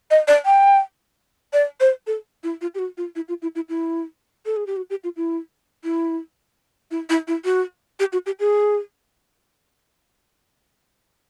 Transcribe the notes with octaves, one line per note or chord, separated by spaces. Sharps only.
D#5
D5
G5
D5
C5
A4
E4
F4
G4
F#4
F4
E4
F4
E4
E4
E4
A4
G#4
G4
F#4
G4
F4
E4
E4
E4
E4
E4
F#4
G4
F#4
G4
G#4